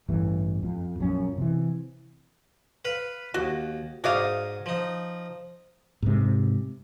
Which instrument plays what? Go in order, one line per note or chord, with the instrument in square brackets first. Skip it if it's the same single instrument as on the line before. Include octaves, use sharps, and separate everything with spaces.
[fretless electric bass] A1 G2 E3
F2
A#1 F#2 F3 C#4
C3 E3
[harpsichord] B4 F5 B5
[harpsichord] D#2 [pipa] F#4
[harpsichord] G#2 D#4 D#6 [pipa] F#4 D5 F5
[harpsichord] F3 D#4
[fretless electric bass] G#2 C3